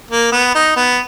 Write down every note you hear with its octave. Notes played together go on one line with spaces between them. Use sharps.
A#3
B3
D#4
B3